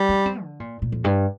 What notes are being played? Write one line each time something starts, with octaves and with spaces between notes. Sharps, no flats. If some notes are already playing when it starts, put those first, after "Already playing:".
Already playing: G3
D4
C4
D3
A#2
A#2
F2
G2